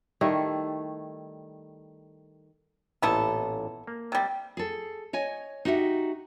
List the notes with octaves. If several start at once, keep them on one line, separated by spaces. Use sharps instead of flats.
D#3 G3 A3 E4
A1 A#2 B3 E4 A4
A#3
C3 G3
G#4 A4
C#5 D#5 G#5
D#4 F#4 G4 E5 F#5